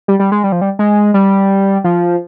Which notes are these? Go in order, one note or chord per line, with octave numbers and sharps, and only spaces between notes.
G3
G3
G#3
G3
F3
G3
G#3
G3
F3